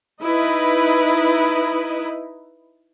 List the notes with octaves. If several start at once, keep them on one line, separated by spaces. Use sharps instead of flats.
D#4 E4 B4 D#5